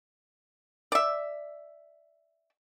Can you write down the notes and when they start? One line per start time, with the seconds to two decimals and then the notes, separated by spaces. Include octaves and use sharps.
0.92 D5 E5